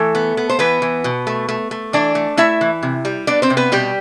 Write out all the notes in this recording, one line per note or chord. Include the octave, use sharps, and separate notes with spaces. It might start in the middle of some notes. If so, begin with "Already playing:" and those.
Already playing: E3 A3 A4
B3
B3
C5
E3 B3 B4
E3
B2
A3
A3
A3
E3 D4 D5
A3
A3 E4 E5
E3
C3
G3
B3 D4 D5
C4 C5
C3
B3 B4
B2 G3 G4